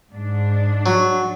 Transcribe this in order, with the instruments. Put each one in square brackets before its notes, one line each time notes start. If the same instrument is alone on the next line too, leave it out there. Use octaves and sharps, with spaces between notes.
[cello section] G#2 D4
[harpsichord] F#3